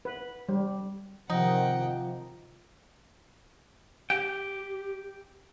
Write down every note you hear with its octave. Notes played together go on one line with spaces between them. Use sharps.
B4
G3
C3 D#3 F3 D#4 F#5 G5
G4 G5